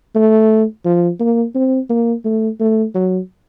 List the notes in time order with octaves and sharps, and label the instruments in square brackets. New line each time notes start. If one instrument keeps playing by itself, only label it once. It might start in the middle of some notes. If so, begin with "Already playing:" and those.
[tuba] A3
F3
A#3
C4
A#3
A3
A3
F#3